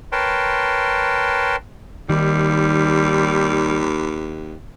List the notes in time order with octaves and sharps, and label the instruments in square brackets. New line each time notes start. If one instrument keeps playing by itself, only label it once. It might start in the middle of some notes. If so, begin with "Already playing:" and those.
[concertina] A#4 B4 C#5 G5 A5 C6
[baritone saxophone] D#2 [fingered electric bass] D#3 [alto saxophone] G3